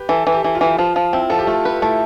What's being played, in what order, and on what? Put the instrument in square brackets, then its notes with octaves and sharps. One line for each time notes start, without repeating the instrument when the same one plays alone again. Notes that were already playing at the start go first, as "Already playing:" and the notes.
Already playing: [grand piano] G4 B4
[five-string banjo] E3 [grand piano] A4
[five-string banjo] E3
[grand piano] G4
[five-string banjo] E3
[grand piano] F4
[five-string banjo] E3
[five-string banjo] F3 [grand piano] F4
[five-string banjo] F3
[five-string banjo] C4 [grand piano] E4
[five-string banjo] F3 [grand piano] A4
[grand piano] G4
[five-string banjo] A3 [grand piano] F4
[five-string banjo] B4
[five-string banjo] A3 [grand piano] E4